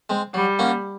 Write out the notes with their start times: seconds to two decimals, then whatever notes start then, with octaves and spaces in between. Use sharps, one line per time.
0.10 G#3 C4
0.34 F#3 G3
0.59 A#3 C#4 F#4